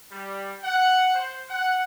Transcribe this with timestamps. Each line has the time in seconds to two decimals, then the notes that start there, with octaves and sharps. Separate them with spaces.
0.12 G3
0.63 F#5
1.15 C5
1.49 F#5